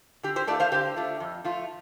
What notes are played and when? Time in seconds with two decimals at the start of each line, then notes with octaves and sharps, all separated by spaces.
0.23 D3 G4
0.36 G4 C5
0.47 A3 D4 F4 A4 D5
0.60 C5 F5
0.72 D3 G4 C5
0.96 A3 D4 F4
1.20 F2
1.45 F3 A3 F4